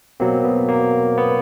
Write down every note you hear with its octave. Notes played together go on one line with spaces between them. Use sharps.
B2 F#3 A#3 C4
B3
A#3
B3